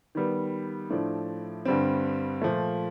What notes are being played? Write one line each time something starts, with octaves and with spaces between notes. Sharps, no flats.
D#3 G3 B3
A2 F3 A3 D4
G2 D3 G3 C4
A#2 F3 A3